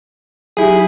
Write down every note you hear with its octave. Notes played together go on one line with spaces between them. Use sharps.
F#3 D#4 E4 G4 G#4